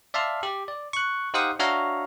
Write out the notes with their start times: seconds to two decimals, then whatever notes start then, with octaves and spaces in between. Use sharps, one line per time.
0.14 D5 E5 F5 A5 C6 F6
0.43 G4
0.68 D5
0.93 C#6 F#6
1.34 D#4 G4 C5 F5 F#5 D#6
1.59 D4 F#4 C#5 E5 F5 A#5